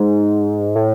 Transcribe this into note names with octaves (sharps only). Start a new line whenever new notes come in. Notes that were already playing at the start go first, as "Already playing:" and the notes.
Already playing: G#2
A2